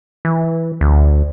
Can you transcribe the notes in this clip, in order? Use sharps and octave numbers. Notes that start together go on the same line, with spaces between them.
E3
D2